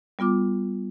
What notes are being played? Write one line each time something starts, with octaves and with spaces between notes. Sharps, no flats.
G3 B3 F4 D6